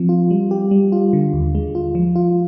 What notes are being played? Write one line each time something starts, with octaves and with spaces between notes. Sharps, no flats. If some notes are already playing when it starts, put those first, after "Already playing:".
Already playing: F3 C4
F4
G3
G4
G3
F4
D3
D#2
G#3
F4
F3
F4